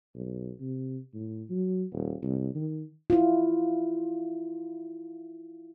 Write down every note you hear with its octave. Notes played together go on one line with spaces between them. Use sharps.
B1
C3
A2
F#3
D#1
C2
D#3
E4 F4